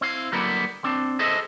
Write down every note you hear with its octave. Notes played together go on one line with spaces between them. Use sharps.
C4 E4 F5
D3 F#3 G3 A#3 B3 E4
C4 D4
G#4 A4 C5 D#5 E5